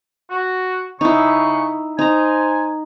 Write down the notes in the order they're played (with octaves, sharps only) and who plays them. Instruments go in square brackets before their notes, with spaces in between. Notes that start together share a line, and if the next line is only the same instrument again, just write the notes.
[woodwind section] F#4
[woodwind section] C#3 C#6 [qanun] D#4 E4
[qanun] D#4 A#5 [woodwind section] C5 G#5